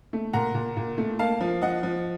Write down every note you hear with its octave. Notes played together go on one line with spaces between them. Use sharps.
A3
A#2 F#5 A#5
A#2
A#2
A3
A#3 F5 A5
F3
F3 D#5 F#5
F3